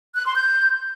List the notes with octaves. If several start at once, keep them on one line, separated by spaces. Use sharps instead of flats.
F#6
C6
G6